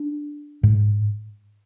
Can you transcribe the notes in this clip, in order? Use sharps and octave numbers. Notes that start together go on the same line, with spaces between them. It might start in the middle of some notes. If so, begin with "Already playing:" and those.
Already playing: D4
G#2